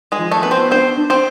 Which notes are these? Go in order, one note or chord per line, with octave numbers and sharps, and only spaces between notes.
G#3 G#4
F3
A3 A4
B3 B4
C4 C5
C4 D4 C5
D4
C4 C5